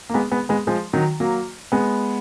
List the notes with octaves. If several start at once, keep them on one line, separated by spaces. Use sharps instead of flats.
A#3
G#3 B3
G#3 B3
G#3 B3
F3 G#3
D#3 F#3
F#3 A#3
G#3 B3